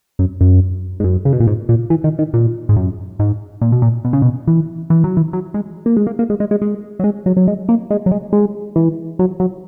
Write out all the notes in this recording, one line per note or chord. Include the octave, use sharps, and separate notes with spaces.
F#2
F#2
G#2
F#2
C#3
B2
A#2
G#2
A#2
E3
D#3
D#3
A#2
G#2
F#2
G#2
A#2
B2
A#2
B2
C#3
B2
E3
E3
F#3
E3
F#3
G#3
A#3
G#3
A#3
A#3
G#3
G#3
G#3
G#3
F#3
G#3
F#3
F#3
G#3
A#3
G#3
F#3
G#3
G#3
E3
F#3
F#3